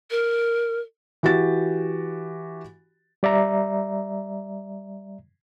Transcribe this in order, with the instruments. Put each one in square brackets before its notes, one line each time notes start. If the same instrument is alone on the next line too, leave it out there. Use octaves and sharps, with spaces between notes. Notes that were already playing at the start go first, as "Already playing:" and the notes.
[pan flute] A#4
[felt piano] E3 F#4 G4 A6
[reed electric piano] G3 D5 E5 A#5